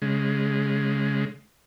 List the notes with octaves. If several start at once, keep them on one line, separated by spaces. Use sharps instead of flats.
C#3 G#3